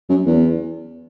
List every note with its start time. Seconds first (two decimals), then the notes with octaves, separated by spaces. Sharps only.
0.09 F#2
0.26 E2